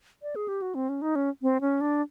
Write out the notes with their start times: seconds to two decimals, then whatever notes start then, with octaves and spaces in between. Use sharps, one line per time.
0.22 D5
0.36 G#4
0.48 G4
0.62 F#4
0.75 C4
0.89 C#4
1.02 D#4
1.16 C#4
1.42 C4
1.61 C#4
1.81 D4